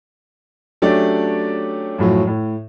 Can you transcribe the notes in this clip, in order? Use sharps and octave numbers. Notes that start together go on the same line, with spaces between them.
F#3 A3 C#4 D4 G4 D5
F#2 A2 F3 F#3
A2